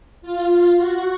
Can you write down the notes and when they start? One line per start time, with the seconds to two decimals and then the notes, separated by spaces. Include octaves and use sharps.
0.22 F4
0.76 F#4